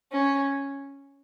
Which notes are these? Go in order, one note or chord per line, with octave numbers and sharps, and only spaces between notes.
C#4